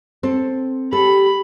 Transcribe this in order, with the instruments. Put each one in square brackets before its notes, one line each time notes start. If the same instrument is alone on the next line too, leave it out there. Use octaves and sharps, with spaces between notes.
[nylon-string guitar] C4 A4
[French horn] G4 [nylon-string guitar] A4 [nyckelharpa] B5